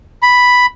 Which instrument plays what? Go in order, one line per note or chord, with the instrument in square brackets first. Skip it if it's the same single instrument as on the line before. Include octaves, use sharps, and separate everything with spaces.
[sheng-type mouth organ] B5